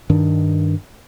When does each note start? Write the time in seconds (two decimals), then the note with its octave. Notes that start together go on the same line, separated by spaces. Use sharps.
0.09 G2 D#3 D4